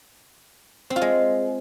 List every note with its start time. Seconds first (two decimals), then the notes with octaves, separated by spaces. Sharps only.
0.90 C4
0.96 F4
1.02 G#3